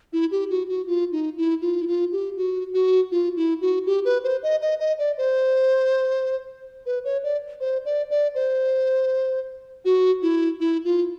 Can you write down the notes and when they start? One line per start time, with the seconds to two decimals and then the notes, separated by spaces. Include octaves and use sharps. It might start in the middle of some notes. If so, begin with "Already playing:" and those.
0.13 E4
0.31 G4
0.50 F#4
0.69 F#4
0.87 F4
1.12 D#4
1.37 E4
1.62 F4
1.82 E4
1.87 F4
2.12 G4
2.37 F#4
2.74 F#4
3.12 F4
3.37 E4
3.61 F#4
3.86 G4
4.05 B4
4.24 C5
4.43 D#5
4.62 D#5
4.80 D#5
4.99 D5
5.18 C5
6.86 B4
7.04 C#5
7.23 D5
7.60 C5
7.85 D5
8.11 D5
8.35 C5
9.85 F#4
10.22 E4
10.60 E4
10.85 F4